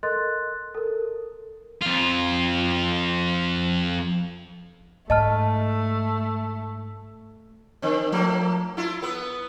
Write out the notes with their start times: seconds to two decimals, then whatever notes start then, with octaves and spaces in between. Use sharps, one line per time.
0.03 A4 A#4 D#5 C6 F#6 A6
0.75 A4 A#4
1.81 F2 F4
5.10 G#2 A3 D#5 A5 F6
7.82 D3 C4
8.12 F3 A3 A#3
8.77 E4 F4
9.02 B3 B4